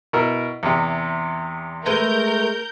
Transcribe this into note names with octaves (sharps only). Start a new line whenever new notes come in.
B2 E4 A#4
E2 C3
G#3 A3 A#4 B4 G6